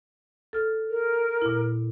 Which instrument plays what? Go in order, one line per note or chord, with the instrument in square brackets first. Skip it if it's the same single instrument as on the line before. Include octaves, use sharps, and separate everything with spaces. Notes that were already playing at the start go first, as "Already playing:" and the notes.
[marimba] A4 F6
[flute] A#4
[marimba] A#2 E4